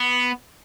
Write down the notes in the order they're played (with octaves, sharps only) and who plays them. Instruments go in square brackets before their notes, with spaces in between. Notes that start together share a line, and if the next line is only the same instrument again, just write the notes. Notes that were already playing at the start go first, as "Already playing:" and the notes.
Already playing: [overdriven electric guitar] B3